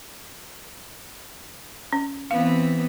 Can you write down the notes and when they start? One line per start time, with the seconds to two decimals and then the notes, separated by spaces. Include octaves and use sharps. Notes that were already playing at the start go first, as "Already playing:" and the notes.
1.93 C#4
2.31 E3 B3 C4 F5